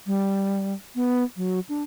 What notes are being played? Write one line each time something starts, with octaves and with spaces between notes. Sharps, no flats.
G3
B3
F#3
D4